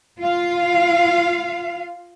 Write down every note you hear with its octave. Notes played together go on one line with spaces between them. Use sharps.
F4 F5